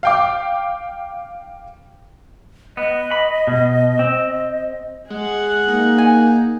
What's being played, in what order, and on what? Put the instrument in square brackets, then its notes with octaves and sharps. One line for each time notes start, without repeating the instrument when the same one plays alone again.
[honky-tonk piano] F5 G5 D6
[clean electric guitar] B3 [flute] D#5
[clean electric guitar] B5
B2
C4
[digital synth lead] G#3 [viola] G#4 F#5
[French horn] A#3 [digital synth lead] D#4
[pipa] G#5